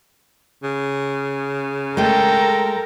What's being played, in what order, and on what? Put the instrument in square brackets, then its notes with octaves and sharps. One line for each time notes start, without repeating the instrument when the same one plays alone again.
[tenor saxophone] C#3
[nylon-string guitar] G#3 A3 [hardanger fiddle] A4 G5 [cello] A#4